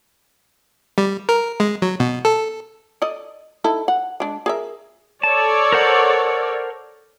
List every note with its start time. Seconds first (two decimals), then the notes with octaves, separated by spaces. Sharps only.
0.98 G3
1.29 A#4
1.60 G#3
1.82 F#3
2.00 B2
2.25 A4
3.02 A4 D5 D#5
3.64 D#4 E4 A4
3.88 F#5
4.20 G#3 D4
4.46 G#4 A#4 E5
5.23 A4 C#5 D5 A5
5.72 A#4 C5 F#5